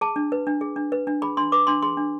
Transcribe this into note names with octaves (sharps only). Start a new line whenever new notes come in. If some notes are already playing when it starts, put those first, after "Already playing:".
G#4 A5
D4
B4
D4
G#4
D4
B4
D4
G#4 B5
D4 C6
B4 D6
D4 C6
G#4 C6
D4